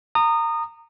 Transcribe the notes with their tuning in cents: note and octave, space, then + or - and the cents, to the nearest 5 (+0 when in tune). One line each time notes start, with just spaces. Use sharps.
A#5 -25 D#6 -20